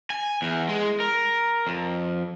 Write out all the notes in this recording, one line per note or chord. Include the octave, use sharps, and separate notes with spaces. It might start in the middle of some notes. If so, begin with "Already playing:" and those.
G#5
E2
G#3
A#4
F2